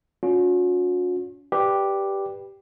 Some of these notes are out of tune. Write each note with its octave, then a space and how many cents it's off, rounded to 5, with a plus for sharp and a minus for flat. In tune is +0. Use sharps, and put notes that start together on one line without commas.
C#4 +30 F#4 -45
G4 +0 B4 -10 D5 +0